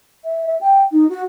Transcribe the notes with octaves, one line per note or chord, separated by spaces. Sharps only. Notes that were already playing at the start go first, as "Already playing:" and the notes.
E5
E5
G5
D#4
F#4